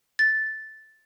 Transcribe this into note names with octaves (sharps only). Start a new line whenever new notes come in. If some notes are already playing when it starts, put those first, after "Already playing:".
A6